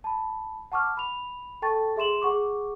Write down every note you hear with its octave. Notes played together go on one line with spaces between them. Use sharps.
A5 B5
F#5 A5 C#6 D6 F6
B5 F7
A4 G5 A5 C#6 A6
G#4 E5 C6 E7 F#7
G#4 F#5 C#6 D6